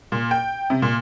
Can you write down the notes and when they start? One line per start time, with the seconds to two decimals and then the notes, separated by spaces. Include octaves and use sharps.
0.12 A#2
0.31 G5
0.70 C3
0.82 A#2